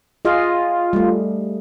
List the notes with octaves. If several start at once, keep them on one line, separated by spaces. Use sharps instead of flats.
F4 G#4 D#5 F5
G3 A3